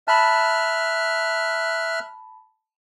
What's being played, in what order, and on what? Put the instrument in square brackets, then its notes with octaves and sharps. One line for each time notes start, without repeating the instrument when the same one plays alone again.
[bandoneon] E5 F6 F#6 [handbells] A5 B5